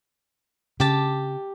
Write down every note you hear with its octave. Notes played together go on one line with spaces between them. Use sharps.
C#3 G4 A5